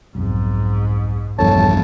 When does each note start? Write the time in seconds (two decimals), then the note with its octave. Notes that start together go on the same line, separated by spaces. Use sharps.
0.15 B1 F2 G#2
1.39 A#1 E2 G2 A#2 A4 C#5 A5